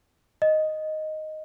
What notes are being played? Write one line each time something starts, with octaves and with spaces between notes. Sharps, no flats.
D#5